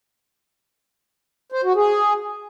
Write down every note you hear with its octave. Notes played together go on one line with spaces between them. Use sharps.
C5
F#4
G#4